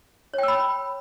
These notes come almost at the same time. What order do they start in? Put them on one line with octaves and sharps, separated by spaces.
C#5 G5 E6 B5